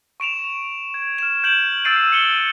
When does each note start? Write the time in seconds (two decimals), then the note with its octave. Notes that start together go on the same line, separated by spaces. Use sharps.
0.20 C#6 D7 E7 F7
0.94 G#6
1.18 F6 E7
1.44 G6 D7 E7 F#7
1.85 E6 G6 A6 C7 D7 D#7
2.12 C#7 D#7 G7